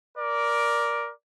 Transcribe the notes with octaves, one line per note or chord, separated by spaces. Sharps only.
A#4 D5